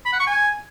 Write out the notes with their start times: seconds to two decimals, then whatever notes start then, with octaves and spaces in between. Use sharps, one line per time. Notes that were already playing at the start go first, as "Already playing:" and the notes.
0.06 B5
0.13 F#5
0.20 C#6
0.27 G#5